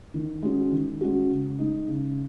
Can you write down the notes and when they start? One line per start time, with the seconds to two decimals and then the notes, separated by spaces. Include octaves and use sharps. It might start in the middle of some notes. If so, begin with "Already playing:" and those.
0.14 D#3
0.42 G#3 C#4 F#4
0.72 D#3
1.01 G#3 C#4 F#4
1.30 C#3
1.59 G#3 D#4
1.88 C#3